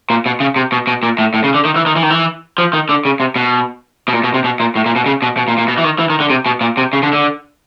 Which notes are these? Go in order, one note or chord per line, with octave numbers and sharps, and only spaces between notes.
A#2
B2
C#3
C3
B2
B2
A#2
A2
A2
C#3
D3
D#3
E3
D#3
E3
D#3
E3
F3
D#3
D3
C#3
C3
B2
B2
A#2
B2
C3
B2
A#2
A2
A#2
B2
C#3
B2
B2
A#2
A#2
B2
E3
D#3
E3
D#3
D3
C3
B2
A#2
C3
C#3
D3
D3